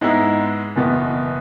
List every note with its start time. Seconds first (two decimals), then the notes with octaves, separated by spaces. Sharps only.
0.01 G#2 G#3 B3 E4
0.76 F#1 E2 B2 B3